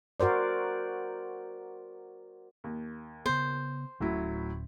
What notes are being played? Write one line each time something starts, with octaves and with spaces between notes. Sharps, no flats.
F#4 A#4 C5 D5
D#2
C#3 B3 C5
D1 A2 F#3 C#4 E4